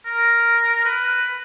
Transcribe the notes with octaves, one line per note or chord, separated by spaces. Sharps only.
A#4
B4